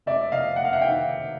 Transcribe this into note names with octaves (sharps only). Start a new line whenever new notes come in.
F1 D5 E5
F1 D#5 F5
F1 F#5
F5
E5 F#5
D#3 F5 G5